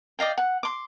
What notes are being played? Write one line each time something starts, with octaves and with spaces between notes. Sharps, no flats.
D5 D#5 F5 G5
F#5
C6 D6